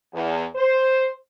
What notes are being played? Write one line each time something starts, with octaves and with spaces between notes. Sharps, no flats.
E2
C5